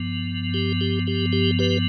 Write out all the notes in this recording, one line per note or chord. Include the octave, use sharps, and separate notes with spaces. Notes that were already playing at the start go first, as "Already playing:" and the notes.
Already playing: G2 F3 B3
G4
G4
G4
G4
G4 B4